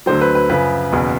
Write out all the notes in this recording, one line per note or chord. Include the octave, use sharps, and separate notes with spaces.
D2 D3 F#3 C5
B4
B4
F#2 C#3 F3 B4
F#1 E2 B2